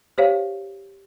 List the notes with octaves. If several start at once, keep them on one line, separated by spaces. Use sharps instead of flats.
G4 C5 C#5 F5